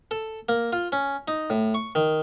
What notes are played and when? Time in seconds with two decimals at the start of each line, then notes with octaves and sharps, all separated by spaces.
0.11 A4
0.49 A#3
0.73 F4
0.92 C#4
1.28 D#4
1.50 A2
1.74 C#6
1.95 D#3